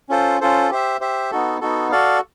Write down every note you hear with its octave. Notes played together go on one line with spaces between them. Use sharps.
C#4 F4 A4 C5
C#4 F4 A4 C5
G4 C5 E5
G4 C5 E5
B3 D#4 F#4 A4
B3 D#4 F#4 A4
F#4 A4 D5 F5